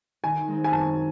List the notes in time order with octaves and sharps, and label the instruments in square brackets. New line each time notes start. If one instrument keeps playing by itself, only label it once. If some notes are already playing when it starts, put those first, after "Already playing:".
[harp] D#3 [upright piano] G#5
[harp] G#3 C4 D#4
[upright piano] G#5
[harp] F#2 [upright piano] A5